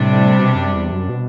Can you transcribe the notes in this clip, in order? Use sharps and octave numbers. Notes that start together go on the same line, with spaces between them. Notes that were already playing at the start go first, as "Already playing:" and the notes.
Already playing: A2 C3 G3 D4
B2
F#2
E2
F#2
B2